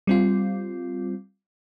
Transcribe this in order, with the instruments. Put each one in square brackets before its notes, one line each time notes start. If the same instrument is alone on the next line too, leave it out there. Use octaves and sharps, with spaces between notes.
[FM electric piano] G3 C4 F4